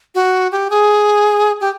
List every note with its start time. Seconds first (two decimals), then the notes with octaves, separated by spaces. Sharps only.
0.15 F#4
0.52 G4
0.70 G#4
1.60 G4